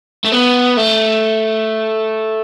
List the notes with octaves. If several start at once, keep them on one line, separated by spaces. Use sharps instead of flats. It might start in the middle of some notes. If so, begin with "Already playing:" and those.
A3
B3
A3